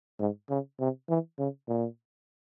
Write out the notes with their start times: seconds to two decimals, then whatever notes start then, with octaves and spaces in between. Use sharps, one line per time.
0.20 G#2
0.50 C#3
0.80 C3
1.09 E3
1.38 C#3
1.68 A#2